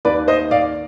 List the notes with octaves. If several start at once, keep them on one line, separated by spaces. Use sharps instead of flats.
D#2 D#3 B4 D5
C5 D#5
D5 F5